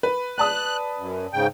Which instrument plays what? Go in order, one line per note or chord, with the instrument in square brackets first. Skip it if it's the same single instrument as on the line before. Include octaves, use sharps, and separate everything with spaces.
[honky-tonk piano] B4
[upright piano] D5 A5 D#6 [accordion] F#6
[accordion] F#2
G#2 C#3 G5